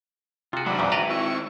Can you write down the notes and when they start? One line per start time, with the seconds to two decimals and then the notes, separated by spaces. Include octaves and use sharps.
0.53 C3 F4 F#4 G#4
0.66 D#3 F#3 G#3 D4 E5 B5
0.79 E2 A#2 C#3
0.92 B4 D5 D#5 A#5
1.10 C4 E4 C#6